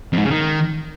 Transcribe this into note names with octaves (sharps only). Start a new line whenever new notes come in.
F2
G#2
C#3
D#3